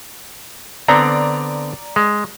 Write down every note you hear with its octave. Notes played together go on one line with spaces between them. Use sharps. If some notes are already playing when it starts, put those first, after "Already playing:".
D3 B3 C4 D5 A#5
G#3